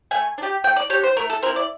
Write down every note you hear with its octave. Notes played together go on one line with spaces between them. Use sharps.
A3 G#5
D4
G4
A3 G5
D5
D4 G4 C#5
C5
A3 A#4
A4
C4 E4 A#4
D5